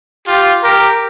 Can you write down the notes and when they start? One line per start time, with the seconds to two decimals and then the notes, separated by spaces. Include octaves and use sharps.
0.27 F4 G4
0.63 G4 A#4